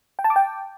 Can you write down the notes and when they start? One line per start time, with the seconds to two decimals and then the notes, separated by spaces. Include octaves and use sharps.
0.19 G5
0.24 A5
0.30 D6
0.36 G5